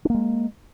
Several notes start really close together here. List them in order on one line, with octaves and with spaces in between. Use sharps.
D4 A#3 G#3